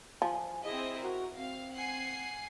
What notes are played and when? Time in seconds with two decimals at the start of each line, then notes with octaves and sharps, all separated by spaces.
0.22 F3 G#5
0.64 C4 E4 G#4 D#5
1.02 F#4 A#4
1.37 C4 F5
1.75 F#5 G#5 C7